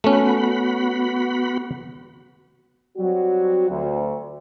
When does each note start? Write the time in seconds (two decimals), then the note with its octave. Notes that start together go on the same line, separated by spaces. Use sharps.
0.04 A3 B3 C#4 F#4 B5
2.98 F#3 G3 C4 F#4
3.70 D2